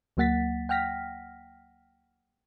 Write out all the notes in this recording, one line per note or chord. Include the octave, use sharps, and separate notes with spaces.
D2 F#3 A#3 F#5 A6 B6
F#5 G5 F6 A#6 B6